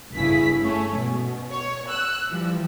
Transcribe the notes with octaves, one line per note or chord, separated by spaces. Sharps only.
G1 C#3 E4 G#4 B6
A3 C#4 C#5
B2
C#5
E6 F#6
E3 F3 G3